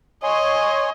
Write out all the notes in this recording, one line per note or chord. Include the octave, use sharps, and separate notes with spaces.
C#5 D#5 G#5 C6